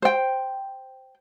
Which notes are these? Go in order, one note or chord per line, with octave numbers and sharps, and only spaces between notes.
C5 G5